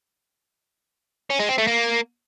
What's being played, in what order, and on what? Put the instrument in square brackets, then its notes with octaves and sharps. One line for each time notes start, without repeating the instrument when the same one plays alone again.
[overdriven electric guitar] C#4
G#3
C4
A3
A#3